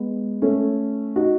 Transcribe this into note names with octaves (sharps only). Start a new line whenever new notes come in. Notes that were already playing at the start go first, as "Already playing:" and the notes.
Already playing: G#3 B3
A3 C#4
D#4 F#4